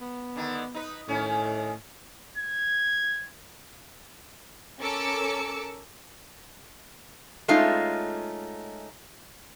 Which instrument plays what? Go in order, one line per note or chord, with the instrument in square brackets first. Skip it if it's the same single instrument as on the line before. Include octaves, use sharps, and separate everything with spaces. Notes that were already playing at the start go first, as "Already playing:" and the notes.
[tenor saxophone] B3
[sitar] D3 D#3
D#4 B4
[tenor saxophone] A2 [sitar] D#3 C#4
[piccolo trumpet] G#6
[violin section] C#4 A4 A#4 D6 E6 C#7
[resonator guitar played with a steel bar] G#3 A3 C#4 D#4 F4